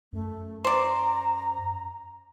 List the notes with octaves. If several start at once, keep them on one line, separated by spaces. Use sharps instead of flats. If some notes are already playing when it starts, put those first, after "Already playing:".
F#2 A3
C5 D5 A#5